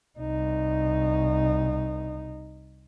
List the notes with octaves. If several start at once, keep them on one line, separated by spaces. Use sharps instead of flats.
C2 D#4